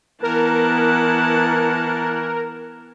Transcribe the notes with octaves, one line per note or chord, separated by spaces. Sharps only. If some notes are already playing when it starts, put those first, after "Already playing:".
E3 B3 A#4 F#5 A5